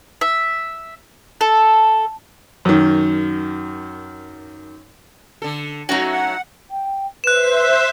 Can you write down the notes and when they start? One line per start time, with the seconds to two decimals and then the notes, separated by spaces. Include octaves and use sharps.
0.21 E5
1.41 A4
2.65 F#2 D#3
5.42 D3 A4
5.89 F#3 A3 C#4 D#4 F#4
6.12 F#5
6.70 G5
7.24 B4 C5 E5 F#6 E7